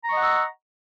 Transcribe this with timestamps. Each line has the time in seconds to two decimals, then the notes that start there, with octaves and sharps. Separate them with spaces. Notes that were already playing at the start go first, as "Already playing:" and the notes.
0.03 A#5
0.08 C#6
0.12 D#5
0.17 F#5
0.22 E6